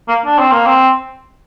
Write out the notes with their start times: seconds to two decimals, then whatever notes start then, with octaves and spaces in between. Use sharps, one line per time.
0.08 A#3
0.26 D4
0.39 C4
0.52 A#3
0.66 C4